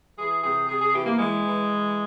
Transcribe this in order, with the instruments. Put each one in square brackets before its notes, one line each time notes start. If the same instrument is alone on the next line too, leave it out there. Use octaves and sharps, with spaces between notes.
[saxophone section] E3 G#4
C3 G#4
C3 G#4
G#4
E3 G4
A#3
E3 G#3
E3
E3